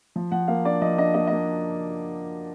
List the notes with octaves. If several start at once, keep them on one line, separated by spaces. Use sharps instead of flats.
F3
F3 F#5
A#3 F5
D4 D5
F3 D#5
D4 D#5
A#3 D#5
D#5
A#3